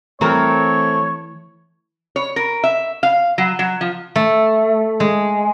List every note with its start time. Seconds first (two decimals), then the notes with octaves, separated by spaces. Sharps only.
0.21 E3 A3 C4 A#4 C#5
2.16 C#5
2.36 A#4
2.64 E5
3.03 F5
3.38 F#3
3.59 F#3
3.81 F3
4.16 A3
5.00 G#3